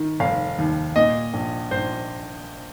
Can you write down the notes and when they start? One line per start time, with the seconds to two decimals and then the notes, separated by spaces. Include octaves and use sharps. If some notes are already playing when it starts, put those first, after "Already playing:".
Already playing: D#3
0.20 F1 F5
0.58 D#2
0.96 A#2 D#5
1.33 A#1
1.71 A#1 C5